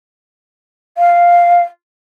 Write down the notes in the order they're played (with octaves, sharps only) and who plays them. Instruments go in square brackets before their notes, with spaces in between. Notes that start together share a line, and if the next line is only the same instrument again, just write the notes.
[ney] F5